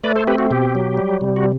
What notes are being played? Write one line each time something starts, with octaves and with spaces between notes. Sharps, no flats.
A3 B4 D5
A4 C5
C4 G4 B4
F#4
B2 G4
F#3
G3
C3
F#4